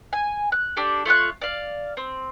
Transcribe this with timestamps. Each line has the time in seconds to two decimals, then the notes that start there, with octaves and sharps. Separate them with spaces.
0.13 G#5
0.52 F#6
0.76 D4 G4 A4
1.05 A3 F4 C#5 F#6
1.41 D5 F5
1.97 C4